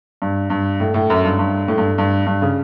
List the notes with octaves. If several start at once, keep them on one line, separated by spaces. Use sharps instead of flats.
G2
G2
A2
A2
F#2
G2
G2
A2
G2
G2
G2
C#3